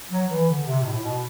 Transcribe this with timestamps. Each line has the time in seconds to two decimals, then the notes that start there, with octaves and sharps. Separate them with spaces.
0.11 F#3
0.30 E3
0.49 D3
0.67 C3
0.82 B2
0.85 A2
1.03 B2